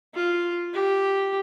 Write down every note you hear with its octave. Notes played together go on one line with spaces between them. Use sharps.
F4
G4